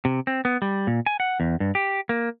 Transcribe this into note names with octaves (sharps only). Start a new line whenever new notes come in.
C3
C4
B3
G3
A#2
G#5
F#5
E2
G2
G4
A#3